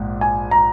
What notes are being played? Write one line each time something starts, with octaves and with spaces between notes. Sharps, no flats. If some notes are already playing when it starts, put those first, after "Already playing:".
Already playing: A#1 G#2
G#5
A#5